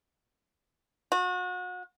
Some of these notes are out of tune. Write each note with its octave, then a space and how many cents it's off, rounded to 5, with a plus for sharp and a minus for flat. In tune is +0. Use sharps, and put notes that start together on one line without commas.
F#4 -35